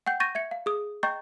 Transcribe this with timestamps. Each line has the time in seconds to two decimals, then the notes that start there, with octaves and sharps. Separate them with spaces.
0.06 F#5 G5 G6
0.20 C#6 G6 A6 A#6 D#7
0.35 E5 G#6 C#7
0.51 F5
0.66 G#4 D#6
1.03 D#5 G5 A#5 C#6 G6 A6